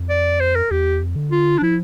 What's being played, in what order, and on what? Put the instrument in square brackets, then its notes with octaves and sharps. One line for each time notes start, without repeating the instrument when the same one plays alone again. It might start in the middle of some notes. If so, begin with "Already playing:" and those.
Already playing: [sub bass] F2
[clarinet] D5
C5
A#4
[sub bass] E2 [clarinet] G4
[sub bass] F2
D3
[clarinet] F4
D4
[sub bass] F3 [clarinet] E4